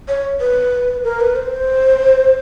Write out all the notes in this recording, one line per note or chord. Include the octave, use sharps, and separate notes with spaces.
C#5
B4
A#4
B4
C5